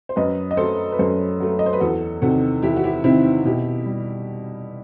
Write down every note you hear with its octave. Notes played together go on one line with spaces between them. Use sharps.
C5
F#2 B4 D#5
D#5
F#3 A3 A4 C5
B4
F#2 A4 C5
F#3 A3
D#5
C5
B4
E2 F#4 A4
C3 D#3 F#4 A4
E2 E4 G4
F#4
E4 G4
C3 D#3 C4 E4
B2 E4 G4
G3